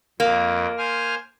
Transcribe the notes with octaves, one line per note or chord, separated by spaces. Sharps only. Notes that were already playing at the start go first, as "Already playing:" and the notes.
F2 A#3
C5 G#5 F6